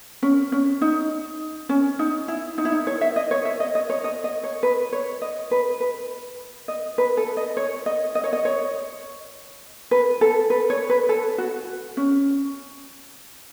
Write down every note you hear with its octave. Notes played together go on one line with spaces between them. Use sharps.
C#4
C#4
D#4
C#4
D#4
E4
D#4
E4
D#4
C#5
E5
D#5
C#5
E5
D#5
D#5
C#5
D#5
D#5
C#5
B4
C#5
D#5
B4
B4
D#5
B4
A4
D#5
C#5
D#5
D#5
C#5
D#5
C#5
B4
A4
B4
C#5
B4
A4
F#4
C#4